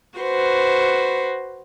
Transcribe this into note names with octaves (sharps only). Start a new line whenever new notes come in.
F#4 B4 C5